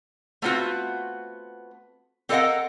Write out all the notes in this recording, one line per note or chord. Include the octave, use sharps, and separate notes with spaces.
A3 B3 C4 F4 F#4
C4 A4 A#4 D#5 F5 F#5